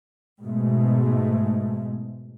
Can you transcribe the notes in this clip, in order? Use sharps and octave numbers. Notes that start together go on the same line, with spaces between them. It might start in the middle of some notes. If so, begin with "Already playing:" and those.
G#2 B2 G#3 A3